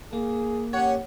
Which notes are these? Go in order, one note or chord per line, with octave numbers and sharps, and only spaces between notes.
A#3 G#4
C#4 G4 C#5 F#5